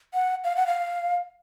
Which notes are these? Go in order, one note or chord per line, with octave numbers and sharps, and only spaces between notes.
F#5
F5
F#5
F5